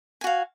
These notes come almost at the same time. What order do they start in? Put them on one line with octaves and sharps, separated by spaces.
G#5 F#4 F5